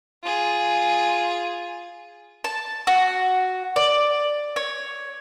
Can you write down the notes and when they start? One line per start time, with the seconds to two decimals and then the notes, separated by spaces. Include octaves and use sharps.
0.23 F4 G#4
2.44 A5
2.87 F#4
3.76 D5
4.56 C#5